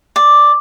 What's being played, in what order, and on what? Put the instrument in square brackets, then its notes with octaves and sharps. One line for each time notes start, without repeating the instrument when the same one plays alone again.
[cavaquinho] D5